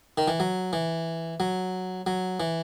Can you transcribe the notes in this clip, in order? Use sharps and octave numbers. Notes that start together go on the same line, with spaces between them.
D#3
E3
F#3
E3
F#3
F#3
E3